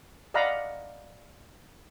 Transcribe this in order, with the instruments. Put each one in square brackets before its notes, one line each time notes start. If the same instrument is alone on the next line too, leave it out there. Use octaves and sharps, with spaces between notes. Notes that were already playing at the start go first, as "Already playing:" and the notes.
[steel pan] D5 D#5 F5 F#5 A#5 B5